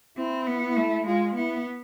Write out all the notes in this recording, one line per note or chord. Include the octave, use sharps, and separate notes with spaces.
C4 E4
B3
E4
A3
G#3 F4
B3 E4